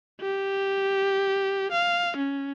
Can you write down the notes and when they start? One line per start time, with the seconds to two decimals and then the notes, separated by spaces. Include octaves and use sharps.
0.22 G4
1.72 F5
2.17 C#4